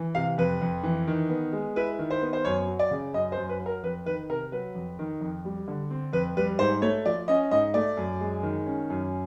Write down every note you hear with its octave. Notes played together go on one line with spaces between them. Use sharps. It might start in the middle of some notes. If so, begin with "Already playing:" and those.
Already playing: E3
C3 F5
F2 B4
F2
E3
D#3
B3
G#3
E4 B4
D#3
C5
B3
C5
F#2 C#5
F#3
D5
C#3
F#2 D#5
C5
F#2
B4
F#3
A#4
F2 B4
D#3 B4
C3 A#4
F#3 B4
F2
D#3
F2
G3
D3
C4
F2 B4
G3 B4
G#2 C5
A3 C#5
F3 D5
C#4 D#5
G#2 D#5
A3 D5
F#2
G#3
D#3
C#4
F#2